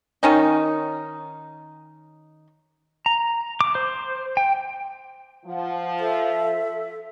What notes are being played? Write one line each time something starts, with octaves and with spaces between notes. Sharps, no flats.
D#3 C#4 D#4
A#5
D6
C5
G5
F3 F#5
F4 A4 E5